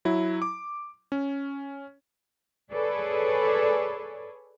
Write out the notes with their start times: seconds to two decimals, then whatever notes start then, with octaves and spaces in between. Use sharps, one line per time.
0.05 F#3 E4
0.42 D6
1.12 C#4
2.71 G#4 A4 B4 C#5 D5